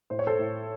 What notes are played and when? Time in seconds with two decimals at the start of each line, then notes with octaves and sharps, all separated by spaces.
0.10 A2 C5
0.19 C#5
0.27 A4 C5
0.39 A2